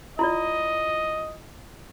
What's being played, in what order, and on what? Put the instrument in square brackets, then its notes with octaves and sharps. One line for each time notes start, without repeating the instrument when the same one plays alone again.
[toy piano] E4 F4 D5 [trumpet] D#5